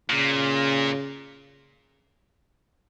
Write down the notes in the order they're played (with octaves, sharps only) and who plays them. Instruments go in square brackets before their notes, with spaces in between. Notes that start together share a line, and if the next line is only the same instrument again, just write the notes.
[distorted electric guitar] A#2 [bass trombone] C#3